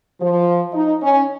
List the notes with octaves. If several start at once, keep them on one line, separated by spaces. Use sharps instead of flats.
F3
D#4
C#4